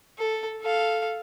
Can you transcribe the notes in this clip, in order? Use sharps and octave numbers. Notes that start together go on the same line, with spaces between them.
A4
A4 F5